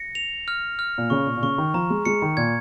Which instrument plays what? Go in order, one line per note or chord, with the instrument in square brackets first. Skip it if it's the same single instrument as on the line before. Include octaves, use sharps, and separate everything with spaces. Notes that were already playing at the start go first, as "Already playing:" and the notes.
Already playing: [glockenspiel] A#6 C#7
F7
F6
F6
[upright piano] A#2
[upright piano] C#3 [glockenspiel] C#6
[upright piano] A#2
A#2
[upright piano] C#3 [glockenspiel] C#6
[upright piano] D#3
[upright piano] F3 [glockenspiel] A#5
[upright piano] G#3
[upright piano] G#3 [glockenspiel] C#7
[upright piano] D#3
[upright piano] A#2 [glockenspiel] G#6